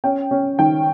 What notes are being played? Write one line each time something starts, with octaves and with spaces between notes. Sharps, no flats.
C#4 G5
C#4
D#3 G5